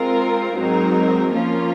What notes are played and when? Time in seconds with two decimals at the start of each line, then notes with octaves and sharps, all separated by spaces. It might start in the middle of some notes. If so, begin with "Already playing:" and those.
Already playing: G#3 C4 F4 A#4
0.55 G#2 F#3 C4 D#4 A#4
1.32 F3 A#3 C#4 F4 A#4